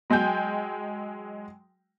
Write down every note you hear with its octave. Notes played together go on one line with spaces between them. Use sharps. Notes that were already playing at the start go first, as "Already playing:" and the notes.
F#3 G#3 G5 G#5 G6